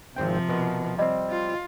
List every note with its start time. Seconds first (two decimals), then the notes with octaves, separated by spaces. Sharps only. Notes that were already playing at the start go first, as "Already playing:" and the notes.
0.16 G#1 C3 F3 C4 G5
0.49 B2 A#4
0.98 G3 C4 D#5
1.30 F4